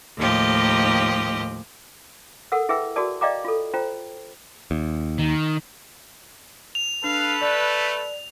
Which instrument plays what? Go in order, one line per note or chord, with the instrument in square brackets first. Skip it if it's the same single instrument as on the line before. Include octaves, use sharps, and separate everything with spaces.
[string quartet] D#2 A2 F3 G4 D#5
[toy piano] A4 A#4 F#5 E6
E4 G#4 B4 E5 G5 E6
F#4 G#4 A#4 D5 A5 D#6
D5 D#5 F5 G5 A#5 D6
F4 A4
F4 C5 G5 A#5
[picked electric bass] D#2
[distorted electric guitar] D#3
[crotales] F7
[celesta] D4 [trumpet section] A4 B4 [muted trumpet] F5
[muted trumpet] A3 [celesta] D5